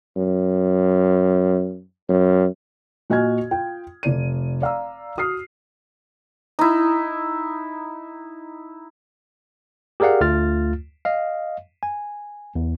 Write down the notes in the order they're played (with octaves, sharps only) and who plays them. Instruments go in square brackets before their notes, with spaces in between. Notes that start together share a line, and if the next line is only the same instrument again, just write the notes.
[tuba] F#2
F#2
[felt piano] A#2 F#4 D#5 G#5 F6 G#6
F4 G5
F1 D5 D#7
D5 F5 A#5 E6
F#4 D#6 F6 C7
[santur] D#4 E4
[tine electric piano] G4 G#4 A#4 D5 F5 F#5
D2 A3 F4 F6 A6
D#5 F5
G#5
E2